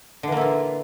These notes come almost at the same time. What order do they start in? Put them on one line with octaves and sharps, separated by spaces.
D3 E3 A#3 E4 F4